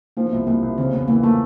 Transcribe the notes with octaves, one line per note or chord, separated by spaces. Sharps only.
F3 A#3
B3
C2 A#3
C2 A#3
C2
C#3 C4
E2 B3
E3 A#3
A3 A#3